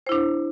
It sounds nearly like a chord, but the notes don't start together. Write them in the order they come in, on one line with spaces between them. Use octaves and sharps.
C5 E4 D4